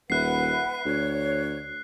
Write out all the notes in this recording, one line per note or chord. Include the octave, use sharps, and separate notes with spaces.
D#1 B4 E5 F#5 F#6 C7
D2 C#5